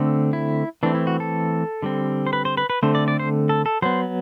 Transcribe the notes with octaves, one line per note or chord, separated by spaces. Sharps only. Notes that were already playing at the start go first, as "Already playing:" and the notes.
Already playing: D3 A3 C4
E4
E3 A3 C4 D4
E4
F#4
A4
D3 G3 C4
C5
B4
C5
B4
B4
D3 A3 C4 C5
D5
D5
C5
A4
A4
F#3 B3 C5